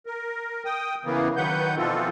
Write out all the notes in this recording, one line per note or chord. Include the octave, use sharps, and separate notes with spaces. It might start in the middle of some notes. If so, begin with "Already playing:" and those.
A#4
G5 D#6
C#3 E3 A#3 B3
D#3 F#3 B4 F#5 G6
B2 E3 F3 C4 F4 A4